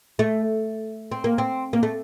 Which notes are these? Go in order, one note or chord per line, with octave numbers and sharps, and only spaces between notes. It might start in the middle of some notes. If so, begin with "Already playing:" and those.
A3
C4
A#3
C4
A#3
A3